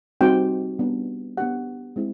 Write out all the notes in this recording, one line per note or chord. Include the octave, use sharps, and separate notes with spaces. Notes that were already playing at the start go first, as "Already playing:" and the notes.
G3 C4 D#4 F#4 G5
G3 B3 D4
B3 D4 G4 F#5
G#3 C4 E4